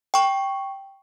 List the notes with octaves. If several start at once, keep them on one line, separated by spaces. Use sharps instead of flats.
G5 C#6